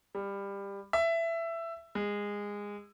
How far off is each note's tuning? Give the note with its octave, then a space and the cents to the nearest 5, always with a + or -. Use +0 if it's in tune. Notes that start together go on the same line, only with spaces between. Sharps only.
G3 +20
E5 +15
G#3 -20